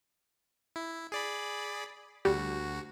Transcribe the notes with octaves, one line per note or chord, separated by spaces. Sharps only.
E4
G#4 D5 B5
D2 G3 F#4